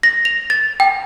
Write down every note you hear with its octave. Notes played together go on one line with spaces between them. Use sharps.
A#6
F7
A6
G5